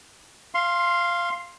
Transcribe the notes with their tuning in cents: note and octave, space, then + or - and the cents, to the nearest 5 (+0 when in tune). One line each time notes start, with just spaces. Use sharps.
F5 -10 C6 +15